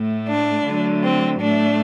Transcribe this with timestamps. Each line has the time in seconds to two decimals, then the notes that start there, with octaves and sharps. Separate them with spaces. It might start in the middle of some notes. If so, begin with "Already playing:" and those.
Already playing: A2 A3
0.27 D4
0.65 D3 F#3 A3
1.02 C4
1.40 A2 A3 D4